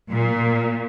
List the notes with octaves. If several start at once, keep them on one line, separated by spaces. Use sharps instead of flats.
A#2